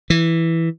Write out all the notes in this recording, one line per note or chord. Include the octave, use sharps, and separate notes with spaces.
E3